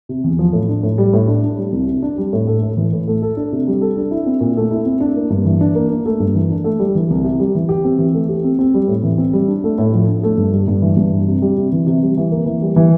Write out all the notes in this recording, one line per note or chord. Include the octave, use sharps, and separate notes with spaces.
C3
E2
F3
A2
D4
A2
G3
A2
D4
D4
G3
C2
C3
D4
G3
A2
A3
A2
E3
A2
A3
A4
D4
C3
G3
A4
D4
E4
C4
A#2
A3
E4
C4
D4
A#3
G2
E3
D4
A#3
D4
A3
G2
E3
D4
A3
G3
E3
C2
C3
G3
E3
G4
C4
E3
A3
G4
C4
C4
G3
A2
E3
C4
G3
D4
A3
A2
F3
D4
A3
G2
G3
G2
E3
G2
G3
C3
G3
C3
E3
C3
G3
E3
A#3
E3
G3
E3